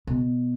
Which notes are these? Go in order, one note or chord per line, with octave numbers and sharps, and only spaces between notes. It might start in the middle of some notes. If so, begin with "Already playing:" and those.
B2